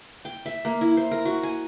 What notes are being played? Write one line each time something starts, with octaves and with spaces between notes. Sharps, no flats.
G5
E5
A#3
E4
C5
A#4
F#4
G#5